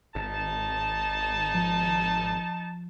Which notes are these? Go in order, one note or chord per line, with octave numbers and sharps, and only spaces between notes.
G#1 D#4 A5
F3